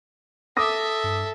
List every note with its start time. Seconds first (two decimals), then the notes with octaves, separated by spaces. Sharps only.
0.57 A4 E5 D6 D#6 A#6
1.04 G2